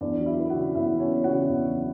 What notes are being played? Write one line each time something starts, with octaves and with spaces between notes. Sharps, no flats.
E2 D4 D5
F#3
E4 E5
B3
F#4 F#5
C#3
E2 E4 E5
F#3
C#4 C#5
B3
F#4 F#5
C#3
E2
F#3